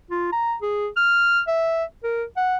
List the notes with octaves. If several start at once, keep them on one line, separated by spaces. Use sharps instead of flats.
F4
A#5
G#4
F6
E5
A#4
F#5